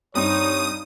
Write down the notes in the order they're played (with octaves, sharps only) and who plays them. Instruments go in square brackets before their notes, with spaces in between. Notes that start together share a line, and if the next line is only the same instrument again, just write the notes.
[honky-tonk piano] G2 C4 [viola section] D#4 [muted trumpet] C#5 [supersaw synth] D#6